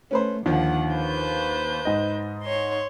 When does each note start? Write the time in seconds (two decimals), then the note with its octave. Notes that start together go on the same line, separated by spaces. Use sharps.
0.11 A3 C#4 B4 C5
0.46 D#2 D3 D#3 F3 F#5
0.93 B4 C5 G6
1.85 G#2 D#5
2.43 C#5 C6